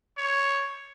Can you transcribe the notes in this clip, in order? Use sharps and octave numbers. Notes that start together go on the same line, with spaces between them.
C#5